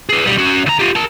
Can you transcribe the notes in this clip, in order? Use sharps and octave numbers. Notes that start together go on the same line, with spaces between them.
G#4 B4
B1 G3
C#4 F#4
D2 A#5
F4 G4
A#4 A5